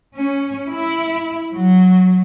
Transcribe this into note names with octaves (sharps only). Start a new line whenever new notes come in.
C#4
E4
F#3